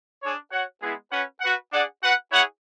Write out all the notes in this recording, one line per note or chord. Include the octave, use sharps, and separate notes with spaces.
D4 G#4 C#5
F#4 C#5 F#5
G#3 B3 E4 G#4
C#4 F#4 B4 F#5
F#4 B4 F#5
D4 G#4 D5 F#5
F#4 B4 F#5
E4 G#4 C#5 F#5